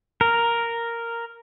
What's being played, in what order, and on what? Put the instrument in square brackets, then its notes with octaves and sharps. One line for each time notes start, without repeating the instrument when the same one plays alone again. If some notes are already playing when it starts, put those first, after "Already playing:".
[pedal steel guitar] A#4